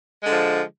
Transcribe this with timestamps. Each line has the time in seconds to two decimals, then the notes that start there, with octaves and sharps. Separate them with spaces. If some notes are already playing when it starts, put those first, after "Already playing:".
0.21 G#3
0.26 D3
0.31 F3